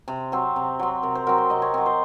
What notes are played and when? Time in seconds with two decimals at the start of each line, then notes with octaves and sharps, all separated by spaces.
0.08 C3
0.32 F#3 C4
0.56 C3
0.79 F#3 C4
1.03 C3 A#4
1.15 C5
1.27 F#3 C4 A#4
1.38 C5
1.50 C3 D#5
1.62 C#5
1.74 F#3 C4
1.86 C5